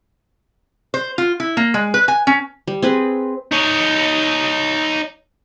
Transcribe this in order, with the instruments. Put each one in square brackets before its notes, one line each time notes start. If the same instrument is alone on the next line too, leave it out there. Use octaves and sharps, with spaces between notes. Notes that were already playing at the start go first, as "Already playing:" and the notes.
[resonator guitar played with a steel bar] C5
F4
E4
A#3
G#3
B4
G#5
C#4
[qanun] G3
C4 G#4 B4
[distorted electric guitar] D#4 C#5